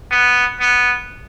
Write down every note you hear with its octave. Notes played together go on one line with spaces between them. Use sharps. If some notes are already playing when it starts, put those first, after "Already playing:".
B3
B3